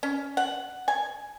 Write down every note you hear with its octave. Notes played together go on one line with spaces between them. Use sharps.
C#4
F#5
G#5